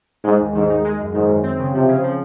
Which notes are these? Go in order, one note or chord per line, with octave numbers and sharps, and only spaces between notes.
G#2 G#3
D#2
G#2 D#3
D#4
G#3
F#2
G#2 D#3
F#2
C4
C#3
C3 F3
C#3
F3